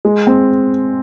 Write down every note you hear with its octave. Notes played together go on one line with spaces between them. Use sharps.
G#3
C4